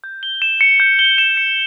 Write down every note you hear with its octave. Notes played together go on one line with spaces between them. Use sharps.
G6
G7
E7
C#7
G6
G7
E7
C#7